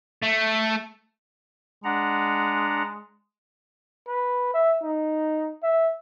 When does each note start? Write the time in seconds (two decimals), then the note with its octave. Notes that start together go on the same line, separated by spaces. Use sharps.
0.22 A3
1.84 G#3 D4 F#5 A#5
4.08 B4
4.54 E5
4.83 D#4
5.63 E5